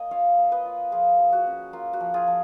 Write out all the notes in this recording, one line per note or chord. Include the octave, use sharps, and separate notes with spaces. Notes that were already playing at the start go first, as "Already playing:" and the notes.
Already playing: A#3 D#5 G#5
F4 C#5 F5
A#3
B4 D#5
F4
F3 F4 G#4
F3
F#4
C#4
A#3 F4
F#4
F3
F4 G#4
F3